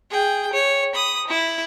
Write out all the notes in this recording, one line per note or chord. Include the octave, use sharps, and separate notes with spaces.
G#4 G5
C#5
B5 D#6
E4